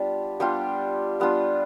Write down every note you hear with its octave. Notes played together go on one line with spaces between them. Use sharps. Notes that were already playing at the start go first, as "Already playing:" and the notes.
Already playing: G3 B3 D4 F4 G4
G3 B3 D4 F4 G4
G3 B3 D4 F4